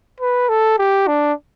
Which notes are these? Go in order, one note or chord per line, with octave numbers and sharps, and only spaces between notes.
B4
A4
G4
D4